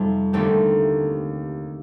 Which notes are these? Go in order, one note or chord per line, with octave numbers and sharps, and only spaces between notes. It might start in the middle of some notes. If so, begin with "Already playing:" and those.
Already playing: F2 C3 G3 C4 D#4 G4
D#2 D3 A3 C4 G4